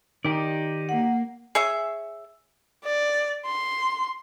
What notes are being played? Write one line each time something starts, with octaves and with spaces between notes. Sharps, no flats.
D#3 D#4 G4 D5
A#3 F#5
G#4 C#5 E5
D5
C6